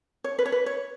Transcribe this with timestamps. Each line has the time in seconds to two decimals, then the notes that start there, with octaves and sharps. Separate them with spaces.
0.24 C#5
0.39 B4
0.46 C#5
0.52 B4
0.66 C#5